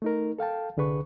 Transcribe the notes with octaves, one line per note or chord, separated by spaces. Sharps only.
A3 D#4 A#4
A4 F5 G5 A5
C2 D3 G#4 B4 C#6